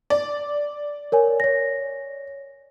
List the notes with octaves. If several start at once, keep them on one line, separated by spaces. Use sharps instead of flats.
D5
A#4 C#5 G#5
C#5 A#6